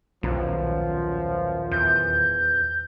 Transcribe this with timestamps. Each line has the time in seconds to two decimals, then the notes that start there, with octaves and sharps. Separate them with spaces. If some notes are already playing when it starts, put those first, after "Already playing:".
0.23 D#1 B1 F#2 F3
1.71 E2 G6